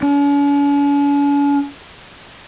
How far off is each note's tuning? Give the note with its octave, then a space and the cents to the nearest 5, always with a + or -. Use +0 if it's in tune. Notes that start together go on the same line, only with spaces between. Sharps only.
C#4 +45